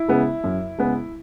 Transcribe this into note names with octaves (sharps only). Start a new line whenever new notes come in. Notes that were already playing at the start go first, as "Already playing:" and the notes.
Already playing: E4
C#3 G#3 B3
F#2
C#3 G#3 B3